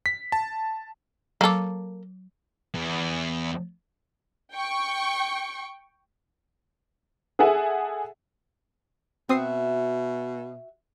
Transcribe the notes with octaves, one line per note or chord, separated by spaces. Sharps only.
B6
A5
F#3 A#3 A4 D6
E2
G5 C#6
G#4 A4 E5 F#5 G#5
B2 C4 F#4 E5 D#6 C7